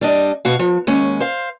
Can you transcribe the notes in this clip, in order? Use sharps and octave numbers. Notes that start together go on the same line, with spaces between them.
G3 D4 D#5
B2 F#4 F5
F3
D#2 G#3 C#4
C5 F5